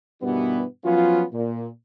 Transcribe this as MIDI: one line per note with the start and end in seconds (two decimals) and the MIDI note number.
0.22 0.63 43
0.22 0.63 47
0.22 0.63 51
0.22 0.63 52
0.22 0.63 55
0.22 0.63 59
0.85 1.23 53
0.85 1.23 54
0.85 1.23 59
0.85 1.23 61
0.85 1.23 65
1.33 1.66 46